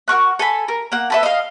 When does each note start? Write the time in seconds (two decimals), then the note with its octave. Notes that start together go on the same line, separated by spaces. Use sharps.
0.08 F#4 A#4 C#6 F#6
0.39 A4 G#5 B5
0.68 A#4
0.92 A#3 F#5
1.10 A4 B4 E5
1.23 D#5 F5